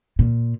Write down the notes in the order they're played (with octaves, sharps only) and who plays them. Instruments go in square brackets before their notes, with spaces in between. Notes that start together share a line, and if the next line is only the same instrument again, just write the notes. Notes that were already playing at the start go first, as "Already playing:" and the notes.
[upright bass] A#2